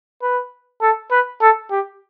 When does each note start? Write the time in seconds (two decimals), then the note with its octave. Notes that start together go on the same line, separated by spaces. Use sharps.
0.22 B4
0.82 A4
1.11 B4
1.41 A4
1.71 G4